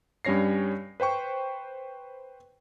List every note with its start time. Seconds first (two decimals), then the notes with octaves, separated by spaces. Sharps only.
0.25 G2 G3 C#4 C#5 A#6 C7
1.00 B4 C5 G5 C#6